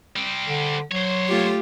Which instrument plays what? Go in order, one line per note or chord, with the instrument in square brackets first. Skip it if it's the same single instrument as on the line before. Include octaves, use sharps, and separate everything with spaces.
[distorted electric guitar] G3 C4
[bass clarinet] D3
[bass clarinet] F#3 [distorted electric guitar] C5 C#5
[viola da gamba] A3 F4 G4